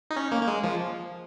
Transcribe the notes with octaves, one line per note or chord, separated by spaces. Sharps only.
D#4
C#4
A#3
A#3
G#3
F3